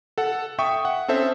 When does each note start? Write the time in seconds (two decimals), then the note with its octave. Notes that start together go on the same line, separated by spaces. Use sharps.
0.18 A4 F#5
0.59 E5 G5 C#6 D#6
0.85 F#5
1.08 C4 C#4 A4 C5 E5